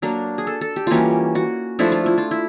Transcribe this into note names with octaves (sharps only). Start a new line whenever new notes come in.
F#3 A#3 D4 A#4
G#4
A4
A4
G4
E3 G3 A#3 C#4 F4 F#4
F#4
F3 A3 D4 E4
F4
E4
F4
E4